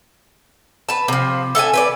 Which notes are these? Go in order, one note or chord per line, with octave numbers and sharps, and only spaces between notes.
B4 A5
C3 F3
A4 E5 F5 G#5
B4 C5 D5